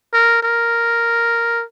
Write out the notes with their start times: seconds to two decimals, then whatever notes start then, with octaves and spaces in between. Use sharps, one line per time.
0.13 A#4
0.43 A#4